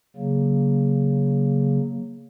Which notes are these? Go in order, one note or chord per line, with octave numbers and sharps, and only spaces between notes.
C#3 F#3 A#3